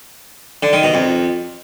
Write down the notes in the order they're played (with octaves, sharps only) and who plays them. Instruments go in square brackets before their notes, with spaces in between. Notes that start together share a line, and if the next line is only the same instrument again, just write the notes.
[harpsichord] D3
D#3
B2
F2